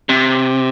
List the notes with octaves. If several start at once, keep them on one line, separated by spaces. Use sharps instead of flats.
C3